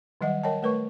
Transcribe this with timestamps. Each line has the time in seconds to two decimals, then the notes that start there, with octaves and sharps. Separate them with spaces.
0.21 D#3 F#3 G3 D#5 F#5
0.43 A#4 C#5 D#5 G5 A5
0.63 A3 A#4 B4 C#5 C#6